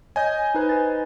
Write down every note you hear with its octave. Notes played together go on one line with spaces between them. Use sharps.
C#5 D#5 G#5 G6
D#4 B4 C5
B4 A6